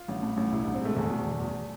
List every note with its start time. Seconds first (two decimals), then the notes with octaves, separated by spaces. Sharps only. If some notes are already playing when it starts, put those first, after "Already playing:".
Already playing: F4
0.08 A1
0.23 A2
0.37 A1
0.52 C2 E4
0.63 C2 D4
0.74 C4
0.82 G#3 A3
0.96 E2 A3
1.11 B2
1.26 E2
1.40 E2